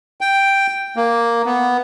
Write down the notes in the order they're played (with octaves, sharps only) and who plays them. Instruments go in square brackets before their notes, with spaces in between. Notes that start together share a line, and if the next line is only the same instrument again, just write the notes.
[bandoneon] G5
A#3
B3